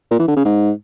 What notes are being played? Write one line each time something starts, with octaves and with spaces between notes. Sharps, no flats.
A#2
E3
D3
C#3
G#2